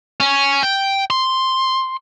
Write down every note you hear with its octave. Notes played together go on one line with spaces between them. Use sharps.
C#4
G5
C6